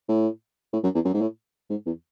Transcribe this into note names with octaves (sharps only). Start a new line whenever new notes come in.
A2
A2
F#2
E2
F#2
G#2
A2
G#2
E2